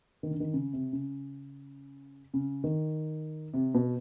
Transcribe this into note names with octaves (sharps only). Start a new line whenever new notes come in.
D#3
D3
D#3
C#3
C3
C#3
C#3
D#3
C3
B2